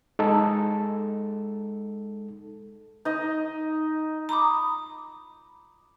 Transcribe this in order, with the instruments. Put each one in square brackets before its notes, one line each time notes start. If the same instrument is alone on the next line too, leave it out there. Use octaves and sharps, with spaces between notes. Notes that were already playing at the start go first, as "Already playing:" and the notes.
[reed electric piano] G#3 D#4 A4
[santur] D#4 D#5
[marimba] A#5 B5 D6 D#6